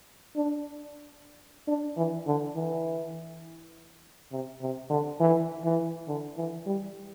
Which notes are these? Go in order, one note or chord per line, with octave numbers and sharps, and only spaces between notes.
D4
D4
E3
D3
E3
C3
C3
D3
E3
E3
D3
E3
G3